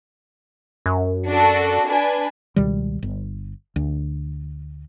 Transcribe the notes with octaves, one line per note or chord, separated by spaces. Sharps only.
F#2
D4 F#4 A4
D4 B4 G#5
C#2 B2 D#3 G3
G1
D2